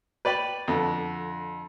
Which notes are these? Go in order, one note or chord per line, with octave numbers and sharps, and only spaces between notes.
B4 D5 G5 B5
F2 D3